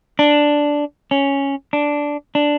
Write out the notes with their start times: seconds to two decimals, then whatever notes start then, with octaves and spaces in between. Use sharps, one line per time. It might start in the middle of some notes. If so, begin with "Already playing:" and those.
0.19 D4
1.11 C#4
1.73 D4
2.35 D4